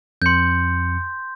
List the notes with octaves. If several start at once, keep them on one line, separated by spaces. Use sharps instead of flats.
F2 C6 G6 C#7